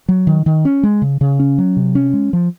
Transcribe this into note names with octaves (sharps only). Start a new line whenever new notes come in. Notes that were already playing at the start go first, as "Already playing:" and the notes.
F#3
D#3
D#3
C#4
G#3
C#3
C#3
C#4
F#3
C3
C#4
G#3
F3